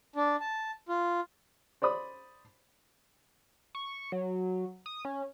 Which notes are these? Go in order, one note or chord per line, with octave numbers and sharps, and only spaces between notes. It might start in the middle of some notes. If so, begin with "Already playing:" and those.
D4
A5
F4
C5 D5 B5 D#6
C#6
F#3
D#6
C#4